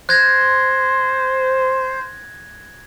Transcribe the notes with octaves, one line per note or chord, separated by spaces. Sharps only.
C5 F#6 G#6 A#6